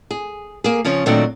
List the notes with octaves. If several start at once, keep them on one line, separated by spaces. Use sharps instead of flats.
G#4
A#3 G#4
C#3 F3 C#4
A#2 D#3 F#3 A3 C4 D4